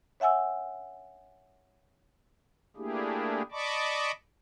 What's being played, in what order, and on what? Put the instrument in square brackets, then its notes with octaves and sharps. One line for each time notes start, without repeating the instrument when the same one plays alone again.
[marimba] C#5 E5 F#5 G#5 E6
[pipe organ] A3 A#3 D4 E4 G4 G#4
D5 D#5 A5 B5 C#6 D6